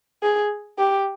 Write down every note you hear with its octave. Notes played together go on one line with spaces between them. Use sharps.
G#4
G4